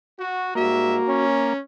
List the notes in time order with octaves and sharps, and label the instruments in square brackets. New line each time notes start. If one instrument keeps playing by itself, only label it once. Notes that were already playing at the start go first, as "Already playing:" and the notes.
[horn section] F#4
[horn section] G#2 G3 E5 [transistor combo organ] A#3 [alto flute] F#4
[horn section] C#4